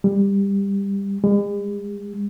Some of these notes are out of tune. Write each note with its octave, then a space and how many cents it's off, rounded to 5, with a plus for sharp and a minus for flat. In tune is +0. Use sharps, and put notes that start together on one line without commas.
G3 +20
G#3 -45